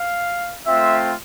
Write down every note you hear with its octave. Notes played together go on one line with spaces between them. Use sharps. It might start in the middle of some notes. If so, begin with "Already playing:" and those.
Already playing: F5
A3 C4 F4 E5